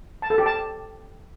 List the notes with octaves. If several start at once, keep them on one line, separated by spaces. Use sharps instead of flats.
A5
A4
G4
A5